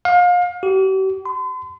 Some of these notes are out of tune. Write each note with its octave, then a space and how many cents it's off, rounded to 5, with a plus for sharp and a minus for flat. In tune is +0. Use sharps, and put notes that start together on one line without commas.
F5 +30
G4 -45
C6 -45